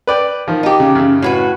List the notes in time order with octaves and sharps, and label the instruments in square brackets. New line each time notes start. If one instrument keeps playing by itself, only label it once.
[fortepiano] B4 D5 G5
D#3 F3
[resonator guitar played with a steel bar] D#4 G4
[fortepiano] C#3
F#2 C#3
[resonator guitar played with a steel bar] A2 F#4 B4